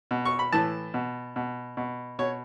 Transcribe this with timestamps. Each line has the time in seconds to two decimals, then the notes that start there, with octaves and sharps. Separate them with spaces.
0.11 B2
0.25 C#6
0.39 B5
0.52 A2 E3 A5
0.94 B2
1.36 B2
1.77 B2
2.19 B2 C#5